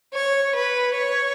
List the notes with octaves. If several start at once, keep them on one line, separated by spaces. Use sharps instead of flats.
C#5
B4
C#5